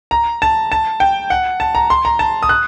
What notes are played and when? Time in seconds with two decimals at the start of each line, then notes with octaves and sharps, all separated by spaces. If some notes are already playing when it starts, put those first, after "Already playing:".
0.11 A#5
0.42 A5
0.72 A5
1.00 G5
1.30 F#5
1.60 A5
1.75 A#5
1.90 C6
2.05 A#5
2.19 A5
2.43 D#6
2.49 F#6